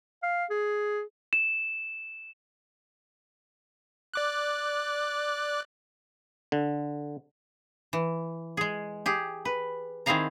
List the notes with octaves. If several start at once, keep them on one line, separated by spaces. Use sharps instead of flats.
F5
G#4
E7
D5 D6 F#6
D3
E3
G#3 G#4
G4 G#4
B4
D#3 C4 E4 G#4 F5 A#5